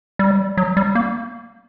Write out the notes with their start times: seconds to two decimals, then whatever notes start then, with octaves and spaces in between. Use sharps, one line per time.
0.19 G3
0.57 F#3
0.77 G3
0.95 A#3